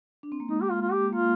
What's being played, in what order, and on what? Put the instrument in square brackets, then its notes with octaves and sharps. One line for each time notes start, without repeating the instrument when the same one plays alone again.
[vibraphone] D4
C4
A#3
[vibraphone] G#3 [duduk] D#4
[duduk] G4
F4
F4
G4
[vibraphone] A#3 [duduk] F4